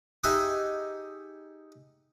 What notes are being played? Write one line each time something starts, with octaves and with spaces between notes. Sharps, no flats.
D#4 G4 G#4 D#5 E5 F#5